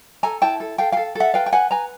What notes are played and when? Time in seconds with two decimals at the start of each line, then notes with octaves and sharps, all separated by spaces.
0.23 A4 G#5 A#5
0.42 E4 G5 A5
0.60 A4
0.78 A4 F5 G5
0.92 F5 G5
0.97 A4
1.15 A4 E5 F#5
1.34 B4 F5 G5
1.46 G5
1.52 B4 F#5 G#5
1.71 B4 G#5 A#5